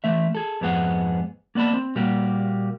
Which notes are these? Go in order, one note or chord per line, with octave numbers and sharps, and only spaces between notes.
E3 A3 E5
G#4 A4
F2 G#2 B3 G#4 F#5
A#3 B3 D5 A5 B5
C4
A#2 G3 A#3 F#4 G4